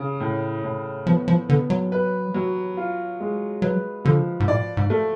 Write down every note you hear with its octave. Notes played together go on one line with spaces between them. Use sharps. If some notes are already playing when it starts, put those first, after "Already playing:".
Already playing: C#3
A2
A2
F3 B3
F3
D3 B3
F#3
B4
F#3
F4
G#3
F#3 B4
D3 F3
G#2
A2 D5
G#2
A3